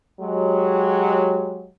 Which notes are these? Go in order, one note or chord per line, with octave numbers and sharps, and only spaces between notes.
F#3 G#3 G4